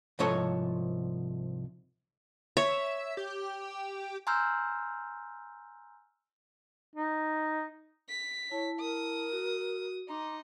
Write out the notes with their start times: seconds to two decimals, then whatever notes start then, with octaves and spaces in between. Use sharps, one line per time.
0.19 C2 G#2 F3 A4 C#5
2.57 C#5 E5
3.17 G4
4.27 G#5 A#5 C6 E6 F6 G6
6.96 D#4
8.09 B6
8.51 E4 C#5 A5
8.80 A#4 D#6
9.32 F#4
10.09 D#4 A#5 C6 D6